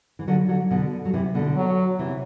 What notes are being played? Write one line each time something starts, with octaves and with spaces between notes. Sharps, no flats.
E3
D3 F#3
D3 F#3
B2 D3
F#3
C3 E3
B2 D3
F#3
C3 E3